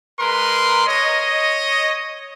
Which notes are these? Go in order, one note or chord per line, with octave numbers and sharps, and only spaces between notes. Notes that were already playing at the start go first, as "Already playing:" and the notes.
G#3 A#4 B4 C6
C#5 D#5